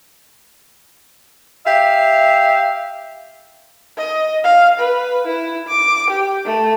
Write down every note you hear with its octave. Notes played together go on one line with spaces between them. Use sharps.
G4 E5 F5
D#5
F5
B4
E4
D6
G4
A3